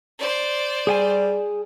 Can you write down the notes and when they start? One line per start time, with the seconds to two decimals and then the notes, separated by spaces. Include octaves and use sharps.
0.18 C5 D5
0.87 G3 G#4 G5 G#5